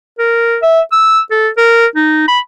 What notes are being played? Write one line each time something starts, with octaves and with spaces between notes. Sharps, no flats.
A#4
E5
E6
A4
A#4
D#4
B5